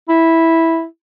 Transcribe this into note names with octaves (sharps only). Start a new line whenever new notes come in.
E4